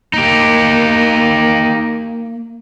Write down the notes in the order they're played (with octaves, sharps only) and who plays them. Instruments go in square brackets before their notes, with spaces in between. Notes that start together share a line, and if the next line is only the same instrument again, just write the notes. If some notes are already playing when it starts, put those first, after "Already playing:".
[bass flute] A#3 [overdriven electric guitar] D#4 G4